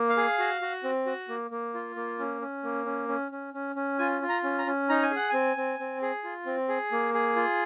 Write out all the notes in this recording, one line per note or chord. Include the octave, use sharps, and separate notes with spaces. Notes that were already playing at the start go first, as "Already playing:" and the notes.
Already playing: A#3
F5
G#4
F#4
F#4
C4
F#4
A#3
A#3
F4
A#3
C#4
C#4
A#3
C#4
C#4
C#4
C#4
C#4
F4 G#5
F4
A#5
C#4
A#5
C#4
D#4 A#5
G#5
G#4 F#5
C4 G#5
C4
C4
G#4
F4
C4
G#4
A#3
G#4
F4